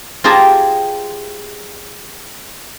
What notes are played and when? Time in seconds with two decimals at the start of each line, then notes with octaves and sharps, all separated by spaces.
0.24 C4 F4 G4 G#4 A5 A#5